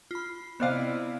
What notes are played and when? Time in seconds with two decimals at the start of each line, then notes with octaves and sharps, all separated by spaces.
0.11 F4 B5
0.60 C3 B3 E4 C5 D5 D#5 F5